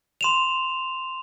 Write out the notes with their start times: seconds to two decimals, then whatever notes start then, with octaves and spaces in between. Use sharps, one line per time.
0.21 C6 E7 F7